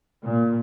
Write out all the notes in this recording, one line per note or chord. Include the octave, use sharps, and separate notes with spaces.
A#2